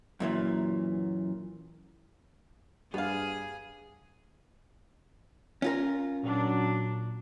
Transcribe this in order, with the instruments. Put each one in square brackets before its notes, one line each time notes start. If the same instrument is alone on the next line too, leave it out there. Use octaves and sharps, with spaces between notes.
[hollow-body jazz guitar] F#2 A#2 E3
[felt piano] G2 G3 [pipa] B3 F5 [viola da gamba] G#4
[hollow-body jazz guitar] C#4 F4 A#4
[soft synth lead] A#2 [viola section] F#3 D4